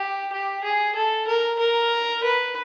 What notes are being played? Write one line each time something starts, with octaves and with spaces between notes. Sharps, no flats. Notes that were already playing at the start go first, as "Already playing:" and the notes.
Already playing: G4
G4
G#4
A4
A#4
A#4
B4